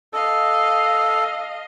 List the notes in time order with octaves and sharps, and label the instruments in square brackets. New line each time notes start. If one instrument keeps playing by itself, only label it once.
[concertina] A4 [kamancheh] D#5 F5